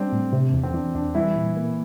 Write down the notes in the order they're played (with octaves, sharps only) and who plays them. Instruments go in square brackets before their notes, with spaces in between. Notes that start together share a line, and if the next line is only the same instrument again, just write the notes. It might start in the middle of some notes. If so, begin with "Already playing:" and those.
Already playing: [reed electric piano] G3 [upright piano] C4 D4
[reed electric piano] A2
C3
E2
[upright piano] C4
[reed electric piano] E3 [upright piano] D4
[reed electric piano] E2 [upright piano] D4
[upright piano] E3 E4 [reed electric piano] G3
[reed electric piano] A#2
A#3